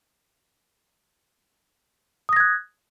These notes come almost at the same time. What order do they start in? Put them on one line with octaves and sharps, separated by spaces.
D#6 A#6 G#6 F#6